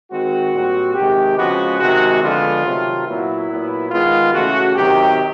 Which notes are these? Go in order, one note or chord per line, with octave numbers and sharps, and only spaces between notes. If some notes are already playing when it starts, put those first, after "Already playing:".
D#3 G#3 C4 F#4
A#2 G3 C4
C3 D#3 G#3 G4
C#3 F3 G#3 B3 F#4
C3 D#3 G#3 F#4
D3 F3 G#3 B3 F4
C3 D#3 F#3 A3
A#2 F#3 B3 E4
A#2 F#3 B3
D#3 G#3 B3 F4
C#3 E3 A3 F#4
C3 D#3 F#3 G4